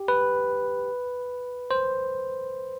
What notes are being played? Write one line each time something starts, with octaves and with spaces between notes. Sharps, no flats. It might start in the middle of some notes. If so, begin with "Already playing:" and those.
Already playing: G4
B4
C5